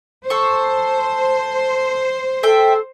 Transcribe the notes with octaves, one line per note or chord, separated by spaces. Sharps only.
A4 C5 C#6
A4 E5 G5